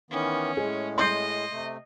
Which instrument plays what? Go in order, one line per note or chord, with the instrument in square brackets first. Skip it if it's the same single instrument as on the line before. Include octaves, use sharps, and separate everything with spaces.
[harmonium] D#3 E3 B3 [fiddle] C#4
[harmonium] A2 G#3 [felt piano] G#4
[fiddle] D#5 [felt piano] C6 G6 C7
[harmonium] C3 A3